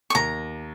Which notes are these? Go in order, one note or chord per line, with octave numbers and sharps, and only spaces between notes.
C#6
D#2 A#5